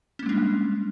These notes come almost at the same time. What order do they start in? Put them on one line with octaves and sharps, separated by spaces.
C#4 A#3 G#3 D4 G3